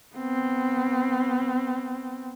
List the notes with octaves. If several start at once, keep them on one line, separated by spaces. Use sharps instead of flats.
B3 C4